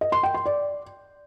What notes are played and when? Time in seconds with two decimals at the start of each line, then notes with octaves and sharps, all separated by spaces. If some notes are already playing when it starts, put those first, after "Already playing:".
0.01 D#5
0.12 C6
0.23 G5
0.34 C6
0.46 D5